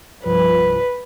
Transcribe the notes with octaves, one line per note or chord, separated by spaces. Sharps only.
C2 G2 F3 B4